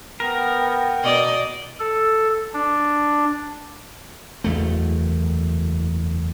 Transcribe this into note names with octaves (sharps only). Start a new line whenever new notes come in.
B3 A#4 G5
B2 D5 D#5
A4
D4
F#1 E2 A3